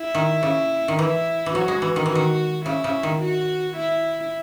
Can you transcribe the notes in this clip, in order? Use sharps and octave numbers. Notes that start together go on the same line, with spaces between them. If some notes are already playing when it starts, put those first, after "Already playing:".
Already playing: E4
D#3
C#3
D#3
E3 E4
E3
F#3 F#4
G#3
E3
D#3
E3 F#4
D#3
C#3 E4
C#3
D#3
F#4
E4